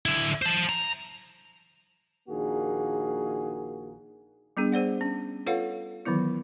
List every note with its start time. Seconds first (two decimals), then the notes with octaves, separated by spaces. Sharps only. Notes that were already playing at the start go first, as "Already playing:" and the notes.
0.06 D3 E4
0.42 C5 A5
0.69 A#5
2.29 A#1 D#3 A#3 F#4 G#4
4.57 G3 B3 D4 G#4
4.72 G#4 C5 D5 F#5
5.01 C#4
5.46 F4 A4 B4 C#5 F5 F#5
6.05 D#3 E3 F#3 B3 E4